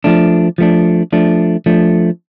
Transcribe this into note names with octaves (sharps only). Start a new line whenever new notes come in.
F3 A3 D4
F3 A3 D4
F3 A3 D4
F3 A3 D4